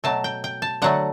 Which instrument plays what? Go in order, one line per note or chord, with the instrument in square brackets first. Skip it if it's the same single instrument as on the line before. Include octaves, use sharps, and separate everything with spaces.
[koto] B2 F#3 A3 A5
G5
G5
A5
D3 F#3 A3 F#5